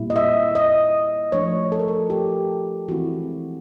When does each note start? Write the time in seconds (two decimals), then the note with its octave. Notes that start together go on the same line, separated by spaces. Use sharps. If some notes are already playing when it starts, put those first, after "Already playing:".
Already playing: A#2 G3 C4 E4
0.10 D#5
0.16 E5
0.55 D#5
1.32 F3 A3 D4 C#5
1.72 A4
1.79 A#4
1.88 A4
2.10 G4
2.88 E3 G#3 C4 E4 F#4